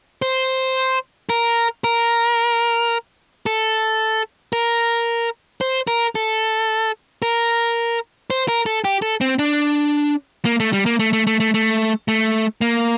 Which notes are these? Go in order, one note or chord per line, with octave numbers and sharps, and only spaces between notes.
C5
A#4
A#4
A4
A#4
C5
A#4
A4
A#4
C5
A#4
A4
G4
A4
C4
D4
A#3
A3
G3
A#3
A3
A3
A3
A3
A3
A3
A#3